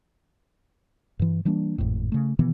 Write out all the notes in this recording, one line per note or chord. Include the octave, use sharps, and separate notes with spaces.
G2 E3
E3 G3 A#3 D4
G#1 F2 A2
C#3 A3
B2 D#3 E3 B3